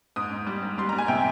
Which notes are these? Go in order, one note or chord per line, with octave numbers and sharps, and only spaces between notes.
G#2 D#6
G#2
G3
G#2
G3 C6
G3 A#5
G#5
C3 G5